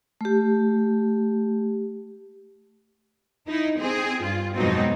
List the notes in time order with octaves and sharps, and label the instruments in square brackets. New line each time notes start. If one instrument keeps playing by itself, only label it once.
[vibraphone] A3 G4
[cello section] D#4 E4
C4 G#4
G2 F4
F2 G#2 B2 F#3 C4 D#4